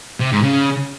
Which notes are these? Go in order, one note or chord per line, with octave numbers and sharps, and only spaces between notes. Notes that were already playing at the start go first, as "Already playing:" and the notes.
C3
G#2
C#3